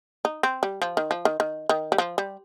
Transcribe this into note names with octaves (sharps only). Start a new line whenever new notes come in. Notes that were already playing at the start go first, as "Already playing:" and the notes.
D#4
C4
G3
F3
D#3
F3
D#3
D#3
D#3
G3
F3
G3